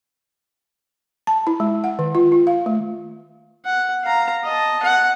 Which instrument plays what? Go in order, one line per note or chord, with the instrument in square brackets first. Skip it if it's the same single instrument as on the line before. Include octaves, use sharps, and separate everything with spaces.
[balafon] A5
E4
G#3
F#5
D#3
F4
F4
F5
A3
[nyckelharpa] F#5
F5 A#5
D#5 A5
F#5